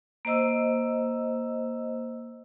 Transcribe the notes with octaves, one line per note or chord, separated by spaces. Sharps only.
A#3 C5 D#5 E6